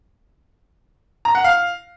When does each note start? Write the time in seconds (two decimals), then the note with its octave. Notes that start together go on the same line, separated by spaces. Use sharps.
1.25 A#5
1.35 F#5
1.44 F5